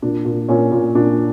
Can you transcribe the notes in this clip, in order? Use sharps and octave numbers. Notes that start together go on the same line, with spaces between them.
A#2 D4
A#2
A#2 C#4
A#2
A#2 D4